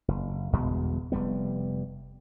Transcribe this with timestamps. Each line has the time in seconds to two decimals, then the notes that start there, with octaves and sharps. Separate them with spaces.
0.08 F#1
0.53 G1 E2 B2 G#3
1.12 F1 G3 B3